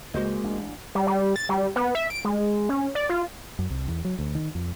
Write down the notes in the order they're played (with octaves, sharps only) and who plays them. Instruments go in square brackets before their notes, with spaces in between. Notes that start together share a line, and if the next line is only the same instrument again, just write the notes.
[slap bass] C#2 C#3 [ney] G#3 [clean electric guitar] A#3 [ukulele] F#4 C5 D#5
[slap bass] A1 D4
[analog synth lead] G3
G3
A6
G3
B3
E5
D7
G#3
C#4
D5
F4
[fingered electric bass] F#2
C2
E2
F#3
D2
D#3
F2